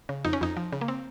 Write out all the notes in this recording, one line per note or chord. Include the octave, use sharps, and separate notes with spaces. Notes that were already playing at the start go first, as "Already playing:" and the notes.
C#3
F2 D#4
C#4
F2 D#4
F3
C#3
A#3
C4